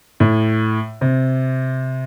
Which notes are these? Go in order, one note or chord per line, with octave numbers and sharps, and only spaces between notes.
A2
C3